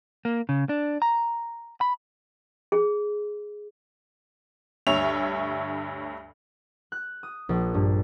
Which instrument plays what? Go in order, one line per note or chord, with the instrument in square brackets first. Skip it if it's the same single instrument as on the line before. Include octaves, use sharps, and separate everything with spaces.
[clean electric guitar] A#3
C#3
D4
A#5
B5
[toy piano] G#4
[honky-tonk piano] D2 G2 C#5 E5 F7
[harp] F#6
D#6
A#1
G2